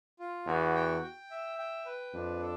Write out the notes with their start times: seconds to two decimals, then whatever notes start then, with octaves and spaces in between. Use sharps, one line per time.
0.19 F4
0.47 E2 F#4
0.75 G5
1.03 G5
1.31 E5
1.59 G5
1.86 B4
2.13 F2 D4
2.42 A4